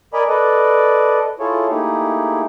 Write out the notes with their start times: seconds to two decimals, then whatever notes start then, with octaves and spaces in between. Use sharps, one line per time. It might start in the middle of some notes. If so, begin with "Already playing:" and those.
0.13 A#4 D5 D#5 G#5 A#5 B5
0.28 A4 B4 D5 D#5
1.40 E4 F4 G#4 A4 C#5
1.69 A3 A#3 D#4 E4 G4 G#4